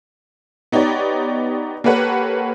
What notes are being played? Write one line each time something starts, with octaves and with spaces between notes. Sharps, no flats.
B3 D#4 G4 C#5 D5
A#3 G4 A4 B4 C#5 F#5